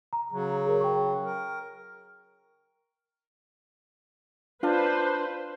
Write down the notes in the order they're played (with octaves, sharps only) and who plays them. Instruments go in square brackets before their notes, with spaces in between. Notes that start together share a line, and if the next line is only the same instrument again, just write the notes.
[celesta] A#5
[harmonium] C#3 F#3
[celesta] G#4 A#4 C#5
G5 C#6
[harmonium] A#4
[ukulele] D4 F4 [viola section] B4 C5